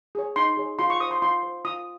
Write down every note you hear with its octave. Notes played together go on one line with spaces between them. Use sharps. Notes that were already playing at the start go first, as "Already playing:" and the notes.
G#4 C#5
D#4 C6
G#4 C#5
F4 C6
C#6
C5 D#6
C6
F4 C6
C5
F4 D#6